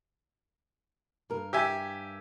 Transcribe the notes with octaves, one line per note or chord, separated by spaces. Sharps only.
G2 A#4
G4 E5 G#5